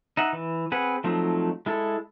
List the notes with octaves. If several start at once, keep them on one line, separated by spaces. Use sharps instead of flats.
D#4 E5 F#5
E3
C4 G#4 B4 F#5
F3 F#3 A3 C4 D#4
G#3 E4 A4